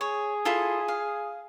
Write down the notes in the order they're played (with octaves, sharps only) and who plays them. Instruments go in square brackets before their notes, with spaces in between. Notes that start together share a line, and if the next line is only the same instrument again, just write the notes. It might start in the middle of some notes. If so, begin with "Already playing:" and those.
[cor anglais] G#4 [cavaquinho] C#5
[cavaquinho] E4 F4 A4
F5